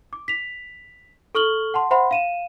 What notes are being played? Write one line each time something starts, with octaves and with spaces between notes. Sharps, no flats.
D6
B6 F7
A4 C#6 F6 F#7 G7
F#5 A5 C6
C5 E5 F#5 B5 C6
F5 D#7 E7